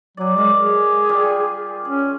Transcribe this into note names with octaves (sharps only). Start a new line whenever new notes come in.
F#3 D5 G#5
G#3 A#4 D6
G#4
G3 F4 G4
C#4 G#4